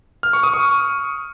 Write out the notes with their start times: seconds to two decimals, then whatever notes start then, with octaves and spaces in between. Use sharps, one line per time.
0.23 F6
0.33 C#6
0.43 D#6
0.54 C#6